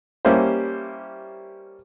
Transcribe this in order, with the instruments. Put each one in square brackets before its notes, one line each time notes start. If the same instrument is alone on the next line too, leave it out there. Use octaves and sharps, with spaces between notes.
[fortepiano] G3 A#3 C#4 E4 G4 C5